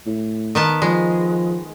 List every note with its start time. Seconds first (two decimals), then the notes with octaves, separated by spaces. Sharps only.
0.06 A2
0.55 D#3 B3 A5
0.82 F3 G#3